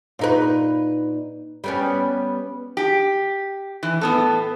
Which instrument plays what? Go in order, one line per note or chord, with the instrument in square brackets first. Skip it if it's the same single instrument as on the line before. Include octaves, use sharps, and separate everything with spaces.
[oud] A#2 D#4 B4
G3 B3 C#4
[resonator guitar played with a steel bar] G4
E3
A2 B3 A4